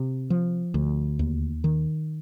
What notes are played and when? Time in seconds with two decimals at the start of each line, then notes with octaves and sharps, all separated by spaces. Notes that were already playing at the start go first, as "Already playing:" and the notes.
Already playing: C3
0.30 F3
0.74 D2
1.19 D#2
1.64 D#3